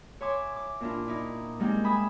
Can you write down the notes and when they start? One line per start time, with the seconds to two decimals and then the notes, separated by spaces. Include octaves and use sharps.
0.21 C#5 E5 G#5 C6 D6
0.56 D6
0.81 A#2 D4 E4 F4
1.06 D#4 E4 D5
1.60 G3 G#3 A#3 C4 D#4 G5
1.84 E5 G#5 B5 D#6